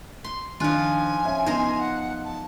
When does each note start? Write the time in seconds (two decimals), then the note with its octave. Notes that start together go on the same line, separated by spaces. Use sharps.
0.24 C6
0.60 D#3 F3 D4 F4 G#5 F#6
1.25 C#4 E5
1.46 B3 D#4 C5 A#5
1.78 F#5
2.24 A5